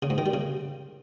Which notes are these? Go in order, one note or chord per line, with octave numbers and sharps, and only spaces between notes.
C#3
G#2
D#3
G3
C#3